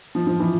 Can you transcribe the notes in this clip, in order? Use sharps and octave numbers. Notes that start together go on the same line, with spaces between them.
F3
F3
E3